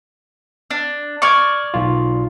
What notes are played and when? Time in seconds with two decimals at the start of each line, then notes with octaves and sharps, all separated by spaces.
0.71 D4
1.22 D5 C#6 D6 F6 G#6
1.74 B1 F4